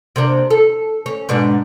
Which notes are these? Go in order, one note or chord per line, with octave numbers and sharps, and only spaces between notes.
C3 A#3 D4
A4
C#4
G#2 B2 D4